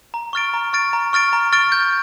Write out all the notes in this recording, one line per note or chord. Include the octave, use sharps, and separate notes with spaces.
A#5
C#6 F6 A6 D7
A#5
C#6 F6 A6 D7
A#5
C#6 F6 A6 D7
A#5
C#6 F6 A6 D7
G6